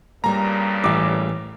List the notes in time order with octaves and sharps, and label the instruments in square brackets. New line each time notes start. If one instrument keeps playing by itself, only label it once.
[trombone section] G2 A#2 C#3 [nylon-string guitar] G3 A#3 [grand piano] A#5
[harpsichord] A1 [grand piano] D6